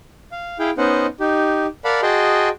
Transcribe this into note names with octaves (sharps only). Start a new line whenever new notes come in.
F5
E4 G#4 F5 G5
B3 C#4 D#4 C5 D#5 F#5
D#4 G4
A#4 D5 F5 F#5 A5 B5
F#4 G#4 D#5 G5 A5 C6